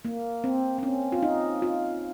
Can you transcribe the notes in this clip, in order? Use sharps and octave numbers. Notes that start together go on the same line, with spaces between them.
A#3
C4
C4
C#4
F4
D#4
F4